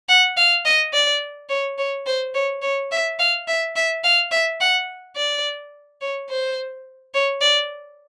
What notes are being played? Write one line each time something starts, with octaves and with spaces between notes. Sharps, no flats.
F#5
F5
D#5
D5
C#5
C#5
C5
C#5
C#5
E5
F5
E5
E5
F5
E5
F#5
D5
C#5
C5
C#5
D5